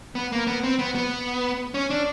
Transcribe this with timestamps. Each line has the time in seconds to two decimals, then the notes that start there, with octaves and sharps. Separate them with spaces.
0.15 B3
0.32 A#3
0.47 B3
0.63 C4
0.79 B3
0.95 B3
1.74 C#4
1.90 D4